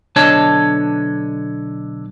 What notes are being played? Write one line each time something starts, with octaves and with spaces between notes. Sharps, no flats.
B1 D3 D4 C#5 D#5 A5